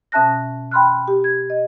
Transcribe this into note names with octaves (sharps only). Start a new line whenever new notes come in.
B2 C#4 E5 A5 F#6 A#6
G5 B5 C6 F6 F#6
G4
G#6
D#5